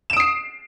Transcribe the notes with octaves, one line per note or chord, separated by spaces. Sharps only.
D#6 C7 D7 E7